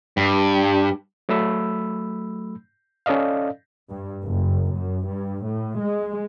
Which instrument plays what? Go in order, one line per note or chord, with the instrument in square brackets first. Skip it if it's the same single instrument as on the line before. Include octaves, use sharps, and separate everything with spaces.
[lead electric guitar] G2
[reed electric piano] F#3 A3 B5 E6
C#4 A4 D5 D#5 F5
[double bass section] G2
F#1
F#2
G2
A2
G#3